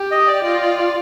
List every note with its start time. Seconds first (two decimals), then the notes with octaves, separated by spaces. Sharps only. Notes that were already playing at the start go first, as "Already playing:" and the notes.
Already playing: G4
0.11 D#5
0.28 D5
0.44 F4 D5
0.61 D5
0.79 D5